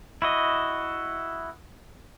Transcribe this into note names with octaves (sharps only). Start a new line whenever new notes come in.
E4 F#4 D#5